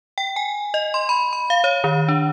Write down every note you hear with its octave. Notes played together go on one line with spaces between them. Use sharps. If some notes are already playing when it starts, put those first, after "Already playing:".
G5
G#5
D#5
C6
B5
B5
F5
C#5
D#3
D4